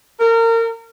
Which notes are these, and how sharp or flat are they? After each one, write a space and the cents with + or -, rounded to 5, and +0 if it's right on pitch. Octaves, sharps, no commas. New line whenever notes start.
A#4 -30